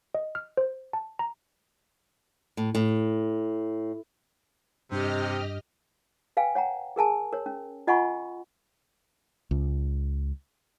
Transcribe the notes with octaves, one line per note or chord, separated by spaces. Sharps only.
D#5
F6
C5
A5
A#5
A2
A2
G2 C3 G4 D#5 F6
B4 F5 G5 G#5
C#5 F#5 G5 A#5
G#4 A#4 G#5 A5
A#4 C#5
C#4
F4 D#5 F#5 G#5 B5 C#6
C#2